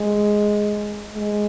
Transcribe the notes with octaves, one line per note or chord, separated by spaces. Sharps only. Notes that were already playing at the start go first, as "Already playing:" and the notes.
Already playing: G#3
G#3